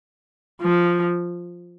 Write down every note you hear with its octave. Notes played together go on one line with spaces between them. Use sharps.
F3